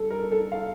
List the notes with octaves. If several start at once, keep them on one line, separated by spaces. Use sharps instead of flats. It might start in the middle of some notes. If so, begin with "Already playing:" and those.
Already playing: G2 A4
A#4
A4
F5